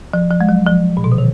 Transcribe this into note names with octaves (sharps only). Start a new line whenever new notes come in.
F3
F3
G#3
F#3
F3
A#2
B2
D3
D#3